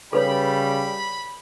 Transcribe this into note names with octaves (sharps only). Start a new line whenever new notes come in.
C#3 G3 A4 B4 C#5 B5